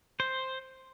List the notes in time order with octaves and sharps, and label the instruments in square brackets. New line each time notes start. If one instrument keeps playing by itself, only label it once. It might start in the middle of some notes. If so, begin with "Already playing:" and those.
[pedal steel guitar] C5